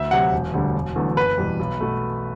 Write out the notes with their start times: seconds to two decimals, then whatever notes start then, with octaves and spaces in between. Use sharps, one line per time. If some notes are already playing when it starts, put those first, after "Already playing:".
Already playing: D2 E5
0.11 C3 F#3 F#5
0.33 E1
0.53 D2 D3 G3
0.74 E1
0.96 E2 D3 F#3 A3
1.17 F#1 B4
1.38 E2 B2 G3
1.59 B1
1.80 B2 A3